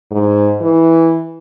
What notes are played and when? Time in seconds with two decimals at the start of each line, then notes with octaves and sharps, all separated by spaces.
0.11 G#2
0.61 E3